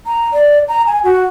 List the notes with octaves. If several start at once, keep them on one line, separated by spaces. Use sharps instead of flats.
A#5
D5
A#5
G#5
F#4